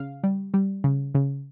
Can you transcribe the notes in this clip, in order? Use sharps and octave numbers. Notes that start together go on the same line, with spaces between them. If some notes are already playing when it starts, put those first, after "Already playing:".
Already playing: C#3 F5
G3
G3
C#3
C#3